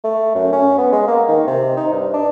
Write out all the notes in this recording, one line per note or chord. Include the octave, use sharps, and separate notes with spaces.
A3
F#2
C#4
B3
G#3
A#3
D#3
C3
D#4
G2
D4